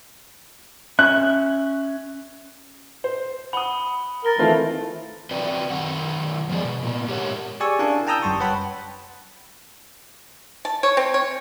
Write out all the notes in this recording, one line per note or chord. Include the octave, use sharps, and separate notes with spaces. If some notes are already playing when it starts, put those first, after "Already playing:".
C#4 E5 F#6
C5
F#5 B5 D#6 G7
A#4 A6 A#6 G7
D#3 E3 A3 C4 F4 A5
C4 F#4 B4 D5 G5
F#2 D#3 F#5
F3 G#3 B3 G#4 D5 D#5
B2
A#2 B3
G#2 G4 A#4 C#5 F#5
G4 G#4 D5 G#5 C#6 E6
C#4 D4 E4 A#4 F5 G#5
G5 A5 A#5 D#6 E6 G6
G1 F#2 G3 A5 C6 C#6
B4 C#5 F#5 G5 A5 B5
A5
C#5
C4
C#5